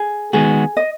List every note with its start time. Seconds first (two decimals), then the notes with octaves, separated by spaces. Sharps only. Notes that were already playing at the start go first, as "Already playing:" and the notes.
Already playing: G#4
0.33 D#3 G#3 B3 D#4 F#4 G#4
0.77 D#5